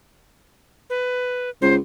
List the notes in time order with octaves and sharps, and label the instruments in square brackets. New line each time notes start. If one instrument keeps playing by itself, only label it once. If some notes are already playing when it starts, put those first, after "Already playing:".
[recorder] B4
[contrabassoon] C#2 [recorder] C5